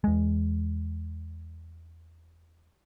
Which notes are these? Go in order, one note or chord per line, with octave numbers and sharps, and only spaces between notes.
E2 G#3